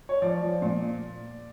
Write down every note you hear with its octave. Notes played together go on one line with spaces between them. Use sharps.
C#5
F3 D5
F3
A#2